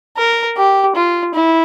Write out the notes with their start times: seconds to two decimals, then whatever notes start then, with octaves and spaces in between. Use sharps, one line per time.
0.17 A#4
0.57 G4
0.96 F4
1.35 E4